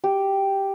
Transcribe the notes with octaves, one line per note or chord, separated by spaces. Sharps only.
G4